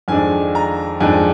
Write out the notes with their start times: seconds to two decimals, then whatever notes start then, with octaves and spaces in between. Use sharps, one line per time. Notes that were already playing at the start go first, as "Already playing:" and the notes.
0.08 F2 D#3 G#3 D4 G#5
0.55 A#5
1.00 F2 D#3 G#3 D4 G#5